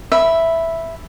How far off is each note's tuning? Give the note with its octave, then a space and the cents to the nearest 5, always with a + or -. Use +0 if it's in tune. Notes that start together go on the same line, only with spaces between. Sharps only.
E5 +0 B5 +0